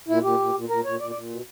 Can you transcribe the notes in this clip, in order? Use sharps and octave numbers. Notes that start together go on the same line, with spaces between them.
A#2 E4
A#2 G4
A#2
A#2
A#2 A#4
A#2 C#5
A#2 D5
D5
A#2
B2